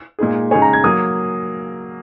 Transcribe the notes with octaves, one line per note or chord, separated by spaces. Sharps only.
A#2 G#3 D#4 G#4
C#3 G#3 D#4 G#4 C#5 G#5
A#5
G#6
F#3 A#3 D#6